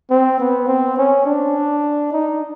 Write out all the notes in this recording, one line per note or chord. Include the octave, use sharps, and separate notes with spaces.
C4
B3
C4
C#4
D4
D#4